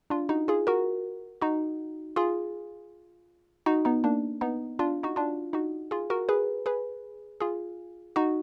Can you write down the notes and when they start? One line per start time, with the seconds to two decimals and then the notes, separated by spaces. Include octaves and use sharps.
0.10 D4 F4
0.29 D#4 F#4
0.48 F4 G#4
0.67 F#4 A#4
1.41 D#4 F#4
2.16 F4 G#4
3.66 D#4 F#4
3.85 B3 D#4
4.04 A#3 D4
4.41 B3 D#4
4.79 D4 F4
5.03 D#4 F#4
5.16 D4 F4
5.53 D#4 F#4
5.91 F4 G#4
6.10 F#4 A#4
6.29 G#4 B4
6.66 G#4 B4
7.40 F4 G#4
8.16 D#4 F#4